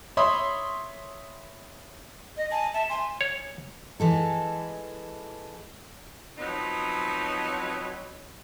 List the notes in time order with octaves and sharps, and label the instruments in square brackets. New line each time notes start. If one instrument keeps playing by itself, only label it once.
[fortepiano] C#5 E5 B5 C6 D#6
[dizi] D#5
[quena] G#5 [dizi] A5
[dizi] E5 [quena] A5
[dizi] G#5 [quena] C6
[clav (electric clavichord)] C#5
[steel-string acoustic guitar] E3 G#3 A4
[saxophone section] F3 F#3 B3 C4 D#4